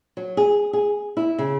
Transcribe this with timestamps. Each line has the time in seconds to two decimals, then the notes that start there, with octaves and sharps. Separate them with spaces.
0.17 F#3
0.37 G#4
0.73 G#4
1.17 E4
1.38 C#3